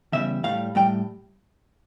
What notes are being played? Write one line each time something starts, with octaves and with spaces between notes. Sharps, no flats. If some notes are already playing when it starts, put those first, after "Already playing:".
E2 C#3 E3 G3 E5
A2 G3 F5
A2 G3 G5